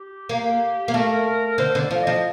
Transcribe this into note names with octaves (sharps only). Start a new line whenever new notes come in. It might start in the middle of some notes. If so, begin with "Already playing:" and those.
Already playing: G4
A#3
A#3
A3 A#4
D3 C5
D3
D5
F3
F3 D#5